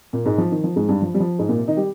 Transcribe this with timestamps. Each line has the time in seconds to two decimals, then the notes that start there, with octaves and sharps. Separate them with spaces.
0.13 A#2 A#3
0.25 G#2 G#3
0.38 F3
0.52 D#3
0.64 F3
0.76 G#2 G#3
0.88 G2 G3
1.02 F3
1.14 G3
1.20 F3
1.39 G#2 G#3
1.49 A#2 A#3
1.58 C3 C4
1.68 D#3 D#4
1.77 G3 G4